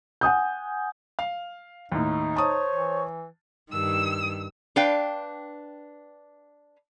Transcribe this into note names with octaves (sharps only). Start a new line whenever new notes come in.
F#5 G#5 D#6 G6
F5
D#2 A2 D#4
C5 C#5 A5 C#6 D#6
E3
G2 D#3 E6
D4 B4 F5 G5